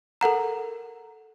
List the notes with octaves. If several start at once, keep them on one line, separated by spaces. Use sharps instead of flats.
A4 A#4 F#5 A#5